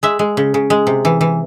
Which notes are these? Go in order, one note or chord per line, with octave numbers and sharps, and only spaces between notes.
G#3 E5
G#3
C#3
C#3
G#3
C3
E3
E3